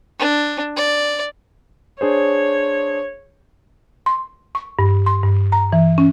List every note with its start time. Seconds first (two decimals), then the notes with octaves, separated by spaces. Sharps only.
0.20 D4
0.77 D5
2.01 D4 G#4 C5 C#5
4.06 C6
4.55 C#6
4.79 G2
5.06 C6
5.23 G2
5.52 A#5
5.73 E3
5.98 C#4